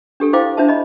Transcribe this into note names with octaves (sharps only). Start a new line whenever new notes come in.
D4 G4 A4
E4 C5 F5 G5 D6
D4 F4 C5 E5 A5
D#5 B5